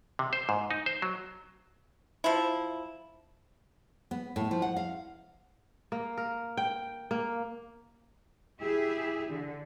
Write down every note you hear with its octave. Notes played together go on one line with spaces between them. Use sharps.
C3
C5
G#2
D#4
C5
F#3
F3 E4
B3
A2
F3
F#5
F5
A#3
A#4
G5
A#3
E4 G4 G#4 E5
D3